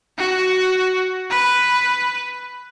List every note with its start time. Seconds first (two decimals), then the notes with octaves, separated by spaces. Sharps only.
0.18 F#4
1.30 B4